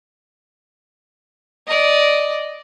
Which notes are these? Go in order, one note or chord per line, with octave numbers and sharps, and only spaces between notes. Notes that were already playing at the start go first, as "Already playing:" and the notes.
D5 D#5